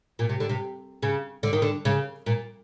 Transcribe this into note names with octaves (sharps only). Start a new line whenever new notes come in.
A#2
C3
D3
C3
C#3
D3
D#3
D3
C#3
A#2